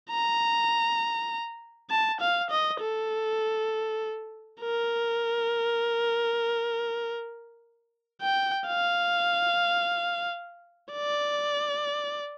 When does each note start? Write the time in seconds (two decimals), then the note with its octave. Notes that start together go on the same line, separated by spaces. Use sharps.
0.11 A#5
1.90 A5
2.21 F5
2.50 D#5
2.81 A4
4.61 A#4
8.22 G5
8.68 F5
10.92 D5